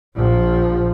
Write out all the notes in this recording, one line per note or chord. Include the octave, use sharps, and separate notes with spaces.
A#1 F3